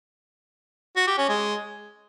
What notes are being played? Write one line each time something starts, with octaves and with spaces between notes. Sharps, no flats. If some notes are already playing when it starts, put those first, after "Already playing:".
F#4
G4
C#4
G#3